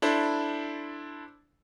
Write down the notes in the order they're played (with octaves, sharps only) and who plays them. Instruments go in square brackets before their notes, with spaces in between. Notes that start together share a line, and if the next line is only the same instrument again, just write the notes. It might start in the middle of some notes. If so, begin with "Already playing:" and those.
[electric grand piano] D4 E4 A4 C5